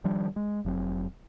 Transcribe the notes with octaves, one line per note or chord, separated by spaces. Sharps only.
D#3 F3 G3 D4
G#3
F1 F#3 C4